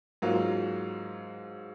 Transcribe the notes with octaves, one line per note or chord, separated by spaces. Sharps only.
G#2 F#3 A#3 F4